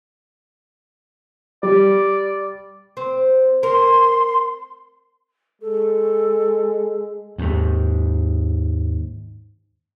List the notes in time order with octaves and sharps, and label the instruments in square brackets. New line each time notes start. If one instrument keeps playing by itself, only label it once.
[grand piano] G3 [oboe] D5
[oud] C4
[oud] A#4 [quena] C6
[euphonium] G#3 [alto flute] A4
[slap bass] D#2 G#2